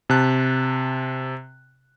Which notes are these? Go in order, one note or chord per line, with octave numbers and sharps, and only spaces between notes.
C3 A5 F#6